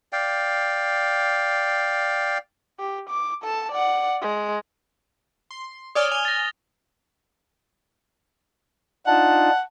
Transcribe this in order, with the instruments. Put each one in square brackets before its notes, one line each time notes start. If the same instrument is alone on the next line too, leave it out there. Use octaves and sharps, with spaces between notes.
[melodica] D5 F5 G5
[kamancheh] G4
D6
A4 A5
D5 F#5
G#3
[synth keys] C6
[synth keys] C#5 D5 G#5 [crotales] D#6 F6 G7
[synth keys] G#5 [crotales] F7 G7
[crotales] A6 A#6
[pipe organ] D4 D#4 F4 [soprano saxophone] F#5 [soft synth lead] A5